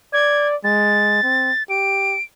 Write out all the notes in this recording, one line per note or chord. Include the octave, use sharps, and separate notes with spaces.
D5 G#6
G#3 A6
C4
G4 D7